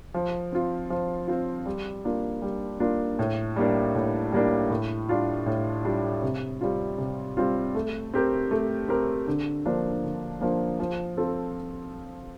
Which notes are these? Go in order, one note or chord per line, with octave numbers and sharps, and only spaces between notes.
F3
C4 F4
F3
C4 F4
G3
A#3 D4 F4
G3
A#3 D4 F4
A2
G3 A#3 D4
A2
G3 A#3 D4
A2
G3 D4 F4
A2
G3 D4 F4
C3
G3 C4 F4
C3
G3 C4 F4
A3
C4 G4 A#4
A3
C4 G4 A#4
D3
F3 A#3 D4
D3
F3 A#3 D4
F3
C4 F4 A4